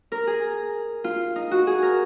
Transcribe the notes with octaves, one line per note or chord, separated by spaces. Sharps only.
A#4
G#4
F4
D#4
F#4
G#4
A#4